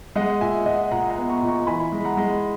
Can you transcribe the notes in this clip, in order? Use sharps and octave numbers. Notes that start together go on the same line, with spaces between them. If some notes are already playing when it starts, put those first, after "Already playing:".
G#3 D#5 F#5
A#2 E5 G#5
A#2 D#5 F#5
A#2 F#5 A#5
F#5 A#5
B3
A#5 C#6
A#2
A#5 C#6
E3 G#5 B5
G#3
F#5 A#5
G#3